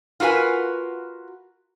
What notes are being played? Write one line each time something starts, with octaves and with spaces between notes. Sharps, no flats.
F4 F#4 A#4 B4 G#5